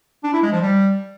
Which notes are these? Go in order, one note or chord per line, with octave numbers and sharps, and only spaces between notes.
D4
E4
G#3
F3
G3